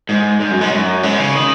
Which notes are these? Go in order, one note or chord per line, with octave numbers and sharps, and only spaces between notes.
G#2
G#2
F#2
G#2
F#2
G#2
C#3
D#3